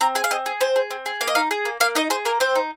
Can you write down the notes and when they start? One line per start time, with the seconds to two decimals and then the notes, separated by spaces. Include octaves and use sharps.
0.01 C4 A#5
0.15 G#4 G#5
0.24 F5
0.31 C4 D#5
0.46 G#4
0.61 C4 C5
0.76 G#4
0.91 C4
1.06 G#4
1.21 A#3 F5
1.27 D#5
1.35 D#4 F5
1.51 G#4
1.65 A#3
1.80 A#3 F5
1.95 D#4 D#5
2.10 G#4 C5
2.25 A#3 A#4
2.40 C4 C5
2.55 D#4